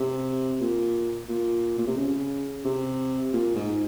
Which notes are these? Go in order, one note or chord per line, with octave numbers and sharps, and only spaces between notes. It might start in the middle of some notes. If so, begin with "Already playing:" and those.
Already playing: C3
A#2
A#2
A#2
C3
C#3
C3
A#2
G#2